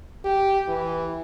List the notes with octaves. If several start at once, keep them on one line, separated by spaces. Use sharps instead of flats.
G4
E3